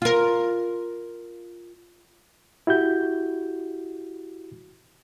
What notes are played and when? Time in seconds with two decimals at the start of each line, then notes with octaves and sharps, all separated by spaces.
0.02 F4 A#4
2.67 E4 F#4 G4 G6